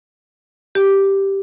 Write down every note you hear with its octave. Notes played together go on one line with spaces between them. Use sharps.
G4